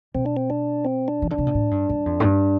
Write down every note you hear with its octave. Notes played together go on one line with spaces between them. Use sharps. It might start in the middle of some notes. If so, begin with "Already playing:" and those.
B2 C4
D4
C4
D4
C4
D4
E3
D3 D4
C3
B2
A2
G2
G2
F2
A2
G2